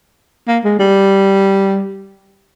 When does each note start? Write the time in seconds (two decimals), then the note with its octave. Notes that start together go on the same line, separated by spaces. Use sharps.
0.47 A#3
0.64 G#3
0.79 G3